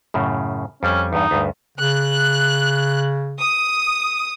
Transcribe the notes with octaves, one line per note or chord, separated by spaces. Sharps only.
F#2 A2 C#3
F2 G3 C#4
E2 G2 D#4
D2 G2
C#3 F#6
D#6